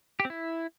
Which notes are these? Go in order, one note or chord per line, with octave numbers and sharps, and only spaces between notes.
G4
C4
E4